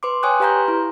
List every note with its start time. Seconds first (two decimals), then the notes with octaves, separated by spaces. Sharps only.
0.03 B4 C6 D6
0.23 C#5 G5 G#5 C#6 D#6 F#6
0.40 G4 B4 F5 A#5 C6 G6
0.68 E4